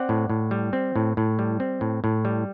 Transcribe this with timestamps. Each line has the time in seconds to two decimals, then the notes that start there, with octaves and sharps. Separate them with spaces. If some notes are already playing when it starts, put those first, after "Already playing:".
Already playing: C4 D5 F#5
0.09 A2
0.30 A2
0.51 G3
0.73 C4
0.96 A2
1.17 A2
1.39 G3
1.60 C4
1.81 A2
2.04 A2
2.25 G3